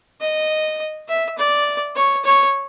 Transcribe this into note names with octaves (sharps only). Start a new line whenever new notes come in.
D#5
E5
D5
C#5
C#5